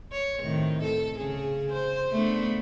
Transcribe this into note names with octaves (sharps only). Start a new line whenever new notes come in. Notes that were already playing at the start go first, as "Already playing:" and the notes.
C#5
A2 C3 D#3
A4
C#3 G#4
C5
A3 B3 D4